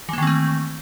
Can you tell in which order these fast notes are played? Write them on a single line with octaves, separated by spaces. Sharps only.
E3 A#3 D#3 C4 A3